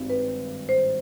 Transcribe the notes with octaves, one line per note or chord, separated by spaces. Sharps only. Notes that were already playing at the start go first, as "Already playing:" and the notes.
Already playing: G#1 G2
B4
C5